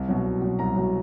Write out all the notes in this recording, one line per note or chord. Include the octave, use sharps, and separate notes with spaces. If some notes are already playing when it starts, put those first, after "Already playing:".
Already playing: C2
B2 F#3
C2
B2 F#3
C2 A#5
B2 F#3